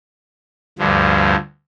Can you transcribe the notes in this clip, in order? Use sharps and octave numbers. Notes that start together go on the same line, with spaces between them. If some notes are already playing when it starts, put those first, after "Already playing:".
D2 G2 F3